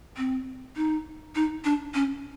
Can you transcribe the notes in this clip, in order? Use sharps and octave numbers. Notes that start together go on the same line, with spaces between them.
C4
D#4
D#4
D4
C#4